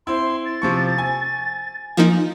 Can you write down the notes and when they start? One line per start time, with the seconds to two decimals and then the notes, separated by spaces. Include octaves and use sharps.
0.07 C4 E4 C6
0.45 A6
0.62 C3 F3 C#6
0.98 G#5
1.97 F3 A#3 D#4